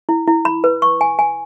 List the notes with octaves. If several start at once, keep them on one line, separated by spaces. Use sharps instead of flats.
E4
E4
B5
B4
C#6
G#5
G#5